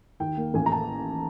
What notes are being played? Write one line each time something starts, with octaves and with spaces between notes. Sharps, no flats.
D#2 G5
A#3
A1 G#5
A#5
A5